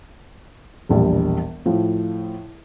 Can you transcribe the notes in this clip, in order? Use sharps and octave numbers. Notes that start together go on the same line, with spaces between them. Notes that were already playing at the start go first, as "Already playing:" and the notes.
E1 A#1 G3
A2 F3